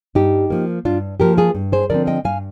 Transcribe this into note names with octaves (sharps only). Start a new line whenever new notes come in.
G2 D#4 G4
F3 A#3
G2 D4 F4
F3 A#3 G4 A#4
F4 G#4
G2
G#4 C5
D3 F3 C4 A#4 D5
D#5 G5
G2 F5 G#5